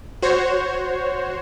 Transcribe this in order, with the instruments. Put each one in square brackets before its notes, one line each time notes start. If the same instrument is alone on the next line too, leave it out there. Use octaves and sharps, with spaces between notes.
[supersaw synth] F#4 C5 C#5